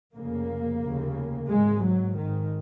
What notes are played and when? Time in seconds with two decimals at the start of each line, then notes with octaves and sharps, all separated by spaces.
0.14 F1 F2 C#3 A#3
0.82 F1 D#2 C#3
1.49 G#1 G#2 G#3
1.83 F#3
2.17 G#1 G#2 D#3